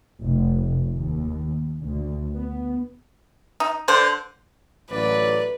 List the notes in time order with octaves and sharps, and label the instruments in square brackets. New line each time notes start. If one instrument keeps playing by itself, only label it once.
[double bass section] F1
D#2
D2
B3
[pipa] D#4
[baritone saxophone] D3 [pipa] C5
[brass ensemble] A1 F#3 D5 [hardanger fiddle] B4